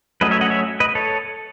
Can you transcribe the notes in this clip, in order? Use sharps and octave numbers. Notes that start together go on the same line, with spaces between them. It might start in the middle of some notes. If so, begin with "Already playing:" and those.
F#3 A3 C#4 B4 D#5
C#5 E5
D#5 F#5
C#5 E5
B4 D#5
A4 C#5